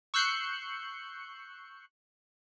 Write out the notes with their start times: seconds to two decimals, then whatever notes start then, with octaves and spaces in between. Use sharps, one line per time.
0.14 C#6 E6 F#6 G6 C7 C#7